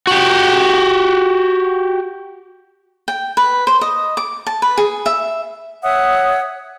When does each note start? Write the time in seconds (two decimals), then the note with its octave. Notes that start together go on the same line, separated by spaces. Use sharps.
0.07 F#4 G4
3.08 G5
3.37 B4
3.67 C5
3.81 D#5
4.17 D6
4.47 A5
4.62 B4
4.78 G#4
5.06 E5
5.83 C#5 E5 F#5 D#6